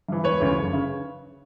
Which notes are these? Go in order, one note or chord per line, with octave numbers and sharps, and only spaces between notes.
G2 E3
E1 B4 C#5
D2 C#3 E3
F#1
C#3